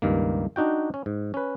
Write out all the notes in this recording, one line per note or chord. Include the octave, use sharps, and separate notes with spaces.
C#2 G2 D#3 A#3
D4 D#4 F#4 G5
C#4
G#2
C#4 B4